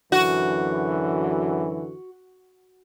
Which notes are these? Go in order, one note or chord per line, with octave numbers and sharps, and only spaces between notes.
F#2 D3 E3 F#4